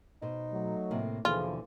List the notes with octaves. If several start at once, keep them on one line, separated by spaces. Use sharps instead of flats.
B2 D#4 C5
F#3 A3
A2 C3 A#3
D#2 B2 D3 E3 F3 F4 G#4